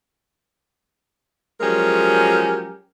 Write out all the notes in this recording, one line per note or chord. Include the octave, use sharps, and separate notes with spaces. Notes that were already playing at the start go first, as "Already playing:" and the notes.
F3 F#3 G#3 C#4 G4 A#4